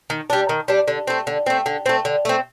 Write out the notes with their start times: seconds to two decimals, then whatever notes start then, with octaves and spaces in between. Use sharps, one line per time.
0.10 D#3
0.30 G3 D4
0.49 D#3
0.68 G3 D4
0.88 D3
1.07 A3 C4
1.27 D3
1.46 A3 C4
1.66 D3
1.86 A3 C4
2.05 D3
2.25 A3 C4